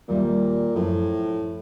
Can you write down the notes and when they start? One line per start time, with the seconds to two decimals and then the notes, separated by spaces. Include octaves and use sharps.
0.08 D#2 A#2 G3 E5
0.76 F#2 A2 F3